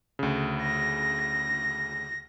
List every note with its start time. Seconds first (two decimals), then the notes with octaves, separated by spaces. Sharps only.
0.19 D2 C#3
0.63 A#6